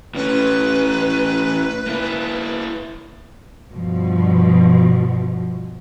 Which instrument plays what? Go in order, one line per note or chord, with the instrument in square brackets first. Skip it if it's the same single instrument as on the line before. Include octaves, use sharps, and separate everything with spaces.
[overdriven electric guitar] A2 C#4 [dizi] B4
[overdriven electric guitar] A#3 E4
[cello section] G2 B2 F3